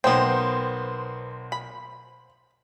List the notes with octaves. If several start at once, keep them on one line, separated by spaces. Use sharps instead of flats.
B1 A#3 B3 C5 C#5 G5
B5